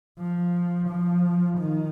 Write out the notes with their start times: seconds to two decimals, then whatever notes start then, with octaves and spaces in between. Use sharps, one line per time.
0.19 F3
0.89 F3
1.58 D#3